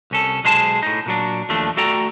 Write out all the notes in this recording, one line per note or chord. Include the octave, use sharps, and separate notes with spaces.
C2 C#4 A4
B1 G#3 G#4 C5 A5
A2 D#4
A#2 F#3 D4
D#2 F3 A3 D4
A3 F#4 A4 D5 G5 A#5